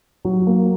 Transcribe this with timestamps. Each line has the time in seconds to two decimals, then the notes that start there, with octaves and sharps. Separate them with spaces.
0.25 F#3
0.47 A#3